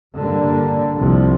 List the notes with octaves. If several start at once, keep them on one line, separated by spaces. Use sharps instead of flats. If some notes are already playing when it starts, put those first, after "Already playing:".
G2 D3 G3 A#3
C2 C3 F3